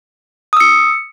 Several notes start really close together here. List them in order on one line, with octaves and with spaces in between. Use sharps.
D#6 E6 C#7